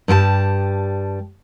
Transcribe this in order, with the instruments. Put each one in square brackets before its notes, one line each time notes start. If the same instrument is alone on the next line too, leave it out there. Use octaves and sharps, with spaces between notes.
[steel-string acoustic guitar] G2 G3 G#5 A5